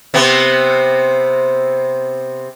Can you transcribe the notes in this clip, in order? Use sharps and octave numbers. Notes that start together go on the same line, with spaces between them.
C3 B3 C4